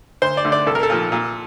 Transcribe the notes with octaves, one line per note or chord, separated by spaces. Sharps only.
D2 C5
D5
D3 A3
D5
C2 A4
A#4
A4
A#2 F3
A#2